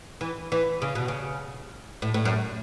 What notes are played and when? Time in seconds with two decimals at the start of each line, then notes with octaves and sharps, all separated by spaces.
0.21 E3
0.52 E3
0.82 C#3
0.95 B2
1.08 C#3
2.02 A2
2.14 A2
2.25 F#2